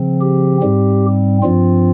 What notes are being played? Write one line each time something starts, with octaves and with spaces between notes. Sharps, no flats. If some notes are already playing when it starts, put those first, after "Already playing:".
Already playing: C#3 F3 C4
G4
G#2 G3 C4
G2 F3 C4 F4